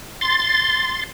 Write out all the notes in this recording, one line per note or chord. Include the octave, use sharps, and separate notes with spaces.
C6 A6